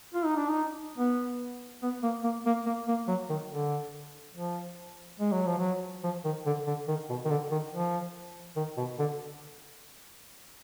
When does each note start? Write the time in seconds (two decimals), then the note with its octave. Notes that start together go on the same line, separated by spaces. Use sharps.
0.14 F4
0.25 D#4
0.36 D4
0.48 D#4
0.98 B3
1.82 B3
2.03 A#3
2.24 A#3
2.46 A#3
2.66 A#3
2.88 A#3
3.08 F#3
3.30 D#3
3.50 D3
4.35 F3
5.19 G#3
5.32 F#3
5.46 F3
5.58 F#3
6.04 F3
6.25 D#3
6.46 D3
6.67 D3
6.88 D#3
7.09 B2
7.25 D#3
7.30 D3
7.51 D#3
7.72 F3
8.56 D#3
8.77 B2
8.99 D3